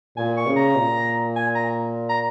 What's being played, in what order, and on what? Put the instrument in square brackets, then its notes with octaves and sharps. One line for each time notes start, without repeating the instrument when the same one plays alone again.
[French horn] A#2 [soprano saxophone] G#5
[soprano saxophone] C#6
[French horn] C#3
[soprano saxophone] A#5
[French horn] A#2
[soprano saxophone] G#5
A#5
A#5